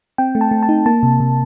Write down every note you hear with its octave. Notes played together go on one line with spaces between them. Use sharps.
C4 G5
A3
A5
A3
A5
D#4
A#3 A5
C3
C3